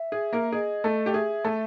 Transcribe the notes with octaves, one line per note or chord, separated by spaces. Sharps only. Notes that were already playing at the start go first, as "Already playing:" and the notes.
Already playing: E5
G#4
A#3 A#4
G#4 D#5
A3 A4
G4
G#4 E5
A3 A4